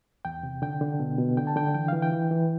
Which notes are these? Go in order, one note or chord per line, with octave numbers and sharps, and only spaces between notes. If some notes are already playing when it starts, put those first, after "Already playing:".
E2 G5
C3
D3 G5
D3
B2
B2
D3 G5
A5
D3 G5
E3 G5
E3 F5
G5
E3
E3